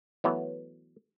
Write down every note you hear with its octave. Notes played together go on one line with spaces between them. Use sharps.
E3 F#3 A3 B3